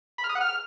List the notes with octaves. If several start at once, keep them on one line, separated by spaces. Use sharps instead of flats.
B5
F6
D#6
F#5
F6